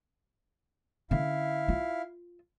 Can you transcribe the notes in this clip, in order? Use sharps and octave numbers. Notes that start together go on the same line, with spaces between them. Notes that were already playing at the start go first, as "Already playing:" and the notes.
D3 C#4 E4 F5
F4